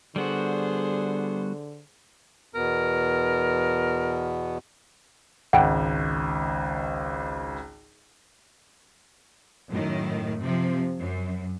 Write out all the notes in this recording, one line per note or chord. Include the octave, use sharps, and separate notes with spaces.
D3 G3 B3 F#4 G#4 C5
E2 B2 B3 A#4
G#1 C#2 F#5 G5
F#2 A2 D#3
C3 F3
F#2